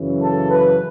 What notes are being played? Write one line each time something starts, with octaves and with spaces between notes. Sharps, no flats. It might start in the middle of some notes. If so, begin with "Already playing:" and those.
Already playing: F#2 C#3 E3
A4
B4